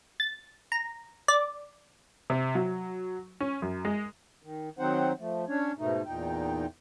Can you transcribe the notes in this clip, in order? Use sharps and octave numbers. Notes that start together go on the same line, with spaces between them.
A6
A#5
D5
C3
F#3
C#4
F#2
G#3
D#3
D#3 F#3 C4 D#4 C5 F#5
F3 A3
C#4 D4 C#5
G#2 B2 A3 D#4
E2 A#2 D#4 G5